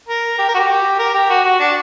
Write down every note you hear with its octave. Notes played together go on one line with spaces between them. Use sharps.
A#4
G4
A#4
F#4
G4
A#4
G4
F#4
F#4
D4